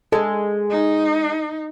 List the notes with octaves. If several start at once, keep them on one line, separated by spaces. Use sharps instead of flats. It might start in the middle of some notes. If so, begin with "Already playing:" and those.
G#3 A4
D#4